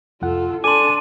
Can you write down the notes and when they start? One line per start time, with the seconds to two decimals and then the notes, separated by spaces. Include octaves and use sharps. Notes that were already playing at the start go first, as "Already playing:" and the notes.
0.22 C2 F2 F4 A4 F#5
0.64 D4 A4 G#5 A5 C6 D6 D#7